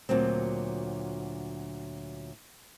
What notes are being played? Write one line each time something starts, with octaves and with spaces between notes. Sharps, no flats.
D2 A#2 F#3 C4